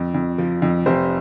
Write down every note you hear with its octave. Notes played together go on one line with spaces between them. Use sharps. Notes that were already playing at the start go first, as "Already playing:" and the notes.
Already playing: F2
F2
F3
F2
F1 G4 C5